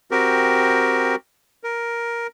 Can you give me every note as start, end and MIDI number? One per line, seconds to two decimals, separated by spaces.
0.11 1.15 60
0.11 1.15 66
0.11 1.15 67
0.11 1.15 70
1.64 2.27 70